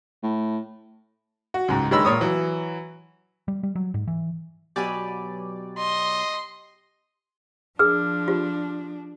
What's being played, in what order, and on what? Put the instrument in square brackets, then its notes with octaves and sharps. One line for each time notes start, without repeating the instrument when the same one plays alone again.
[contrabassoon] A2
[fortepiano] F#4
C#2 G#2
G2 D#3 G#3 C#5 B5 E6
A#2 C#5 D#6
E3 F#3
[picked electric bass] G3
G3
F#3
G#2
E3
[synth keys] B2 F#3 D5 [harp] G4 G#5 B5
[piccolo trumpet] D#5 [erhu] C6
[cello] F3 D4 [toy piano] G#4 A#4 [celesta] F6
[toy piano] F4 G4